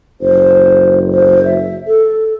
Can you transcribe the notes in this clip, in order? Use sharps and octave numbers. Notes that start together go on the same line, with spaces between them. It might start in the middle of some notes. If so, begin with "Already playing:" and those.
F#1 C5
C5
E5
A4